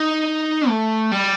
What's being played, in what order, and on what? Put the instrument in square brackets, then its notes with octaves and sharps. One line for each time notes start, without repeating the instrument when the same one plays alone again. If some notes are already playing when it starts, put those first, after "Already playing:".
Already playing: [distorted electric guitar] D#4
A3
G3